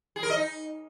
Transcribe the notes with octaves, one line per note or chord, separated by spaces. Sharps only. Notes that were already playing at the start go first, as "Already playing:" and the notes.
G#4
A#4
D#5
D#4